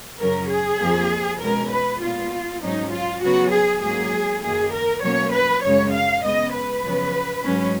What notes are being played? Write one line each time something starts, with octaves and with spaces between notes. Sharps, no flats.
F#2 C#3 F#3 C#4 A#4
G#4
F2 F3 A#3
B2 G#3 C#4 A#4
B4
A#2 G#3 B3 F4
G#2 F#3 C#4 D#4
F4
C#3 F#3 B3 F#4
G#4
G#2 F#3 A#3 C#4 G#4
F#2 D#3 A#3 G#4
A#4
B2 F#3 A#3 C#4 C#5
B4
F#2 C#3 G#3 C#5
F5
C#3 G#3 B3 D#5
B4
F#2 C#3 F3 B3
G#2 F#3 C#4